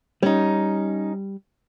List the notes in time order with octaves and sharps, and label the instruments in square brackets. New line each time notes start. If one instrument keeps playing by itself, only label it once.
[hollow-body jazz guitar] G3 [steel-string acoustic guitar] C#4 D#4